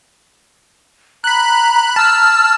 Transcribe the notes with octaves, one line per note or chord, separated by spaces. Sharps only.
A#5 B5 F#6
A5 E6 F6